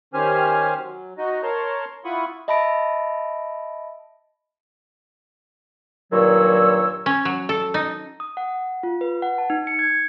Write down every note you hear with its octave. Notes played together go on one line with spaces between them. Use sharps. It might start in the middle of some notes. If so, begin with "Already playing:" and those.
D#3 C#4 G4 C5 G#5 F6
F#3
D#4 F#4 D#5
A#4 C#5 A5 A#5 C6
E4 F4 F#5 B5 C#6 D#6
D#5 E5 A5 B5 A#6 D7
G2 A#2 D#3 F#3 C#5 E6
C#4
F#3
A4
D#4
D#6
F#5
F4
B4
F#5
A5
D#4
C#7
G#6